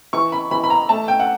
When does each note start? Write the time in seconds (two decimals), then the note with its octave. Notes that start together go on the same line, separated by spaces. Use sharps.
0.13 E3 C#6
0.32 B5
0.51 E3 B5
0.64 B5
0.70 A#5
0.89 A3 A5
1.08 G5
1.19 F#5